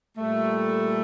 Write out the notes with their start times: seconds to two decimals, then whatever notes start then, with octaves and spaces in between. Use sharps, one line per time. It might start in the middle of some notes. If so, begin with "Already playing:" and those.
0.18 A#2 G3 A3